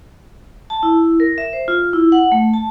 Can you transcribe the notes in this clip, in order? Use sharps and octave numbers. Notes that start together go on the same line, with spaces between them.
A5
E4
A#4
E5
C5
F4
E4
F#5
A3
A5